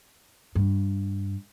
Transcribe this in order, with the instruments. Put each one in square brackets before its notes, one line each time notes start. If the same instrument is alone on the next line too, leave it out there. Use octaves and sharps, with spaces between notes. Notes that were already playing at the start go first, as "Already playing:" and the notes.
[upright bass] G2